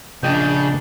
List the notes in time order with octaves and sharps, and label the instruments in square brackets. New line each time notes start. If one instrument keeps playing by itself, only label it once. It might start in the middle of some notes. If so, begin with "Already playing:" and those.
[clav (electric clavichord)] A#1 D#5 G5 [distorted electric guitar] C#3 [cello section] D4 [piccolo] G6